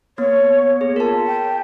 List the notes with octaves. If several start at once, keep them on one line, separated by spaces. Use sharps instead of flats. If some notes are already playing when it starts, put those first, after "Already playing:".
A#3 B3 C#5
G#4
F4 A#4 A5
G5